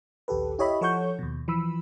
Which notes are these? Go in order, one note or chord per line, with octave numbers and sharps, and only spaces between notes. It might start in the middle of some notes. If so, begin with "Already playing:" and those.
A#1 D#2 G4 A4 B4
E4 G4 C#5 D#5 E5 B5
F3 A4 C#5 F#5 C#6 G6
D#2 B2
E3 F3 B5 E6